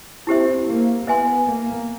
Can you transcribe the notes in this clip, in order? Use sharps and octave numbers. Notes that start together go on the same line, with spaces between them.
C4 E4 G4 C5 E5
A#3
B3 C5 E5 G#5 C6
A#3